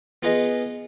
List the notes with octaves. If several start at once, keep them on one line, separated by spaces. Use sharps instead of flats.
B3 F4 G#4 B4 D#5